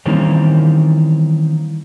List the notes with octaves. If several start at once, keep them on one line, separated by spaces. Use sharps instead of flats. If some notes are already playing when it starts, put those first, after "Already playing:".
D#3 E3 G3 A#3 C4 C#4